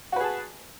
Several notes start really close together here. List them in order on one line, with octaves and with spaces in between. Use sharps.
F#4 B4 G#4 A5